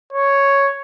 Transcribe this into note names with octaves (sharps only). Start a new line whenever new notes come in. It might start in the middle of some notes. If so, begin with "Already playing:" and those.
C#5